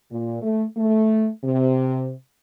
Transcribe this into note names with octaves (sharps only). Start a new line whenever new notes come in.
A#2
A3
A3
C3